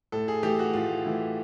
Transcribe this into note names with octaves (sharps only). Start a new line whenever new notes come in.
A2 A4
G#4
E3 A3 G4
F#4
A2 F4
E3 A3